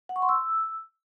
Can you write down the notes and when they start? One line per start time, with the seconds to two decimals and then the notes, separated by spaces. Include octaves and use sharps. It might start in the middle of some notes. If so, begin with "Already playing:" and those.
0.09 F#5
0.16 C#6
0.22 C6
0.29 E6